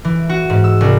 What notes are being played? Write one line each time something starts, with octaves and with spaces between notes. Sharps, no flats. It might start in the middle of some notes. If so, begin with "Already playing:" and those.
E3
F#4
G#2
E6
C2